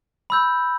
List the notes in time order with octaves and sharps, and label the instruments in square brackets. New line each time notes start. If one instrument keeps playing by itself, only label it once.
[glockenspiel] B5 E6 G6